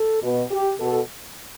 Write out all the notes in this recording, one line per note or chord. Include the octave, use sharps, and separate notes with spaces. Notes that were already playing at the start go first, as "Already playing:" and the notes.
Already playing: A4
B2
G4
B2 A4